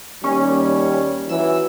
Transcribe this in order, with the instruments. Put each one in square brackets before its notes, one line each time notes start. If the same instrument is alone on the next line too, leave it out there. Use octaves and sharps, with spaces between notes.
[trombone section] D#2 G3 [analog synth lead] C#4
[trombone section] E3 F#3 [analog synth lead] E6